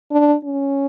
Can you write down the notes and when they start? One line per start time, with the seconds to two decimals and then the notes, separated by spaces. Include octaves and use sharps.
0.11 D4
0.44 C#4